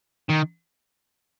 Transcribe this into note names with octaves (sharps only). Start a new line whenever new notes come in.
D#3